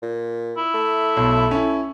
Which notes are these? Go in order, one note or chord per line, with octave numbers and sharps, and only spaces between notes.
A#2
E4
A3
B1
C#4 E4